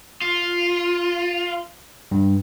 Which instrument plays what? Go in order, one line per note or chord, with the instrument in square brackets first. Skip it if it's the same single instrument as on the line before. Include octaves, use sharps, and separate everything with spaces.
[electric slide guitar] F4
[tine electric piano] G2